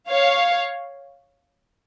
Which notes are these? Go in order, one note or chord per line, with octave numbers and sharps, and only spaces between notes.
C#5 F5